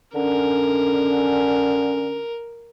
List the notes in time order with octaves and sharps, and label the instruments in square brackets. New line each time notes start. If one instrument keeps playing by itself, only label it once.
[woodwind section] D3 C#4 [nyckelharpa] A#4